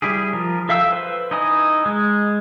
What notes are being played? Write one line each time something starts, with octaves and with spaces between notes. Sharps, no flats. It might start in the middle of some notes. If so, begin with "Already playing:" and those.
G3 E4 G4 G#4
F3 A#4
A4 E5 F5 G5 E6
B4 C5
D#4 E4 D#5 G#5 D#6
G#3